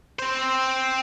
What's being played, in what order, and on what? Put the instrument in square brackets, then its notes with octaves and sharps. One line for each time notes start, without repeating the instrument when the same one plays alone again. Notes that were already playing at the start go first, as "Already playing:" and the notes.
[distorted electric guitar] C4 C5